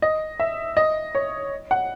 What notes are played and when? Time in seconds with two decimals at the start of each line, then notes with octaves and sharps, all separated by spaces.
0.02 D#5
0.40 E5
0.77 D#5
1.15 C#5
1.71 F#5